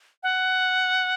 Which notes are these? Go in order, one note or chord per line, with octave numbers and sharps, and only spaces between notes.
F#5